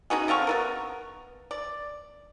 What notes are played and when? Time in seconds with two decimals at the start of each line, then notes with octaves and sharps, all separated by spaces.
0.10 C#4 D#4 F#4 G#4
0.28 D3 C4 F5 C#6
0.47 B3 F4 A#4
1.51 D5